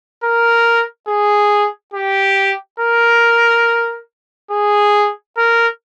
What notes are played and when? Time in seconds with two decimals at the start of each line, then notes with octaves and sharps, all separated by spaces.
0.24 A#4
1.08 G#4
1.94 G4
2.80 A#4
4.50 G#4
5.37 A#4